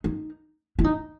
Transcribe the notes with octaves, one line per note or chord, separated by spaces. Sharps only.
D#4
E4
D#4